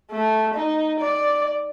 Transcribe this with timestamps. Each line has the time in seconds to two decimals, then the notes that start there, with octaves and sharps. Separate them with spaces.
0.11 A3
0.54 D#4
1.00 D5